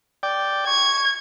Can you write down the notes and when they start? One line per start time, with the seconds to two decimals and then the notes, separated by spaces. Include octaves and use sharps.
0.23 D5 G5
0.67 C#6 G#6